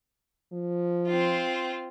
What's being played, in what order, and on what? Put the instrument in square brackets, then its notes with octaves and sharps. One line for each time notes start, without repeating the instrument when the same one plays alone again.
[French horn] F3
[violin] C4 F4